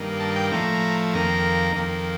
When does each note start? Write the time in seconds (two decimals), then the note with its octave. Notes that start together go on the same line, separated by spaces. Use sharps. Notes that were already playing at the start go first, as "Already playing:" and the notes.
Already playing: G2 D#3 A#3
0.20 A5
0.36 G5
0.51 A2 F3 A3 A#5
1.13 F2 D#3 A#3 A#5
1.76 F2 D#3 A#3